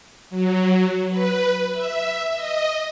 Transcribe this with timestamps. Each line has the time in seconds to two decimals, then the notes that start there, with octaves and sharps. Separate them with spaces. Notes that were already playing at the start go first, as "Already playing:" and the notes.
0.30 F#3
1.10 B4
1.72 E5
2.34 D#5